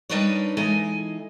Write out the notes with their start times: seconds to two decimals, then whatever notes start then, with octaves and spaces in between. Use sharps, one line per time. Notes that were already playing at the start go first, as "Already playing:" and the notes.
0.09 G3 D4 D#4 A#4 B4 C#5
0.57 E3 G#3 D#4 A4 G#5